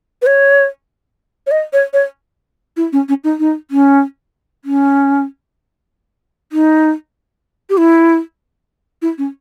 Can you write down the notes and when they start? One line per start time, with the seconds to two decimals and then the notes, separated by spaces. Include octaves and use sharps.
0.22 B4
0.26 C#5
1.47 C#5
1.51 D#5
1.73 C#5
1.93 C#5
2.77 E4
2.93 C#4
3.09 C#4
3.24 D#4
3.39 D#4
3.71 C#4
4.65 C#4
6.52 D#4
7.70 G4
7.78 E4
9.02 E4
9.18 C#4